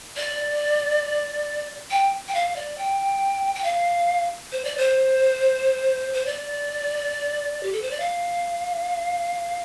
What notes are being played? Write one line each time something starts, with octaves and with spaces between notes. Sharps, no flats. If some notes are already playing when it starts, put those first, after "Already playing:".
D5
G5
G5
F5
D5
G5
G5
F5
C5
D5
C5
C5
D5
G4
A4
C5
D5
F5